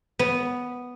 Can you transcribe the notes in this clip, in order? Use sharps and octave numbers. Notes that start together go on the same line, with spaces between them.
B3